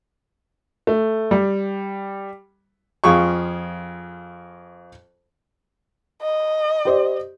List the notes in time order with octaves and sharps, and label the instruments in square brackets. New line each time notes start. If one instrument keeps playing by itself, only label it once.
[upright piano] A3
G3
[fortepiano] F2 F4 G#4 C#6
[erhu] D#5
[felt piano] G4 C5 D5